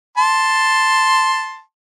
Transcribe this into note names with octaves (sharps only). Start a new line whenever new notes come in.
A5 C6